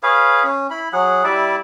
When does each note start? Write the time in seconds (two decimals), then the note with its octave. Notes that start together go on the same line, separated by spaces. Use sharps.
0.03 G#4 B4 C#5 F5
0.44 C#4
0.70 E4 B5
0.93 F#3 G#4 F#5
1.24 G3 E4 D5 E5